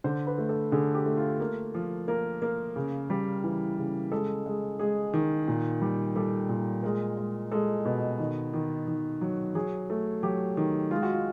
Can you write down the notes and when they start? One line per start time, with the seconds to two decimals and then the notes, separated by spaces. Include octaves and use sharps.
0.04 D3 C5
0.27 B4
0.38 A3
0.49 A4
0.72 D3 G#4
0.94 G4
1.06 A3
1.17 F4
1.40 A#3
1.74 F3
2.08 A#3 A#4
2.42 A#3
2.76 C#3
3.10 G3
3.44 E3
3.78 C#3
4.12 G#3 A4
4.46 G#3
4.79 G#3 G#4
5.14 D#3
5.48 A#2
5.81 G3
6.16 G3 A4
6.49 A#2
6.83 G#3 A#4
7.17 G#3
7.52 G#3 A4
7.85 B2
8.19 D#3
8.53 D#3
8.87 D#3
9.21 F#3
9.55 F#3 G#4
9.90 A3
10.23 F#3 G4
10.57 D#3
10.91 G#3 F4
11.03 F#4
11.13 F4